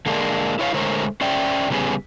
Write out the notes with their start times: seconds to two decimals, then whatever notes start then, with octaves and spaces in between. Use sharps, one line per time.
0.06 D3 G#3 A#3 D4
0.59 E4 B4 C#5 D#5 F5
0.74 D3 G#3 A3 A#4 C5 C#5
1.21 C#4 C5 D5 E5 G5
1.70 C#3 G3 B3 C#4 G#4